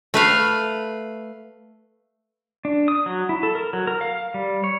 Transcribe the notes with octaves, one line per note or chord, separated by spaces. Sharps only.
A3 B4 F5
D4
D#6
F#3
E4
A4
A#4
F#3
A#4
F5
G3
C#5